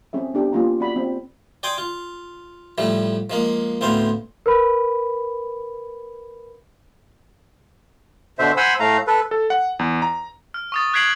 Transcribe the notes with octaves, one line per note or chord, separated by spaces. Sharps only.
C4 C#4 G#4 E5
B3 D4 G4
A#3 C#4 F4 G4 A#5
C#4 F#4 D5 B5
C4
D5 G5 G#5 C6 D6 D#6
F4
A2 F3 G3 A3
F3 G#3 A#3
D2 A2 B3 C4 C5 F5
A#4 B4 B5
B2 D3 C5 E5
C5 F#5 G#5 B5 C6 E6
A2 A3 F5 A#5
A4 B4
A4
F#5
E2
A#5
F6
C#6 D#6 A6
F#6 G#6 B6 C7 D7 F#7